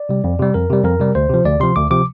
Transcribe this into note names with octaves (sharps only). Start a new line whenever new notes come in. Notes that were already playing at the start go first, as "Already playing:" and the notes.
Already playing: D5
C3 G3
F2
C3 G3
F2 A#4
C3 G3
F2 A#4
C3 G3
D2 C5
C3 F3
D2 D5
C3 F3 C6
D2 D6
C3 F3 D6